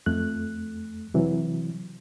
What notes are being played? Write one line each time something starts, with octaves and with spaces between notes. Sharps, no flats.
F2 A3 F#6
C3 E3 F#3